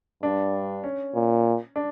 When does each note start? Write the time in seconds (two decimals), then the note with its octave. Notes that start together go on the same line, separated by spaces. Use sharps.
0.23 G2 D4
0.84 C#4
1.15 A#2
1.76 D4